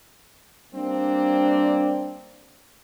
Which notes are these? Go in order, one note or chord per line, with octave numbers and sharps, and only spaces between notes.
G3 A#3 C4 D4